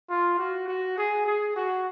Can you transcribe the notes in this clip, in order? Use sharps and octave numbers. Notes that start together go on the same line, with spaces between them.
F4
F#4
F#4
G#4
G#4
F#4